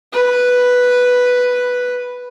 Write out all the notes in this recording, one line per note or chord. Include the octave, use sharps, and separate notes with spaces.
B4